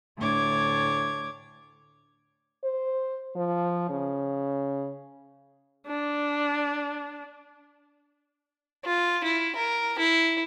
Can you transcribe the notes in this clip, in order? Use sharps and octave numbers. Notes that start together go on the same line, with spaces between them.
D2 A2 D4 C#5 D6 G#6
C5
F3
C#3
D4
F4
E4
A#4
E4